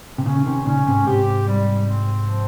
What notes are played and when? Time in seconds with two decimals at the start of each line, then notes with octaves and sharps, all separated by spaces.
0.18 C3
0.26 A#2 C#3 C#4
0.37 C#3
0.46 C3 D#3
0.66 A#2 C#3 C#4
0.87 G#2 C3
1.06 G#2 C3 G4
1.47 G3
1.86 C4
2.27 F3